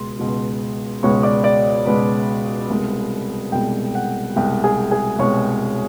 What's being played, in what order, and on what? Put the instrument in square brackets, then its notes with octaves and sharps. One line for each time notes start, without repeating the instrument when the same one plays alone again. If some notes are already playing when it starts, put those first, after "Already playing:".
Already playing: [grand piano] C#2 B2 G#3 C6
C#2 B2 G#3
C#2 B2 G#3 C#5 C#6
D5 D6
D5 D6
C#2 B2 G#3 B4 B5
C2 B2 G#3
C2 B2 G#3 G5
F#5
C2 B2 G#3 G5
G#4 G#5
G#4 G#5
C2 B2 G#3 C#5 C#6